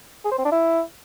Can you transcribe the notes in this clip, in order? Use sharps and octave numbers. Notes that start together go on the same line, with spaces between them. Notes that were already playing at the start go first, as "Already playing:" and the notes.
G#4
C5
C4
D4
E4